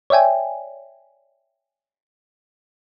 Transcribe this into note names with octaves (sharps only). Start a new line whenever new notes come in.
C#5 D5 E5 G5 G#5